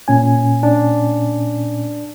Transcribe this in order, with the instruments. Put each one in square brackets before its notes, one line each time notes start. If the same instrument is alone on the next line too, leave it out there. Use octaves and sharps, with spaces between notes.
[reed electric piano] A#2 C#4 G#5
[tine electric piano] D4